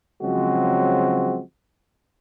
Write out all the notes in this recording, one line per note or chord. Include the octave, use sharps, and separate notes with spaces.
C#3 F3 F#3 G#3 C4 F#4